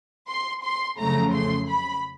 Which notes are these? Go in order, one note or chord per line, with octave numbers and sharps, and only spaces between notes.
C6
C6
F2 C#3 F#3 A3 A#5
C6
B5